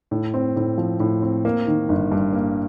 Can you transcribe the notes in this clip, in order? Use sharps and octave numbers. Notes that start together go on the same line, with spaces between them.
A2
C4
A2
F3
A2
C4
A#3
D#3
G1
G2
A#3